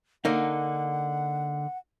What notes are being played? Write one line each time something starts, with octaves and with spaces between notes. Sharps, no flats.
D3 A#3 D#4 F#5